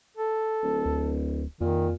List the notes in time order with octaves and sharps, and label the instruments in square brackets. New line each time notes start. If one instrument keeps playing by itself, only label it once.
[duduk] A4
[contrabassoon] D1
[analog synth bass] D2
[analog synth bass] F2 [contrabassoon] A#2 [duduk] D#3